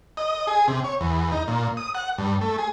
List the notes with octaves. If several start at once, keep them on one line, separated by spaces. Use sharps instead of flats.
D#5
G#4
C3
C#5
E2
D#4
A#2
D#6
F#5
G2
A3
G#4